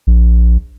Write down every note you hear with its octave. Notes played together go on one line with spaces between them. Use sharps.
A#1